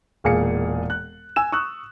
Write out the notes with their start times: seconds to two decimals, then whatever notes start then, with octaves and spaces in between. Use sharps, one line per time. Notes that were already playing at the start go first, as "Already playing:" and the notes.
0.24 E1 A#2 G#4 F5 C#7
0.90 F#6
1.36 G#5 E6 E7
1.52 C#6 D#6 E6 F#6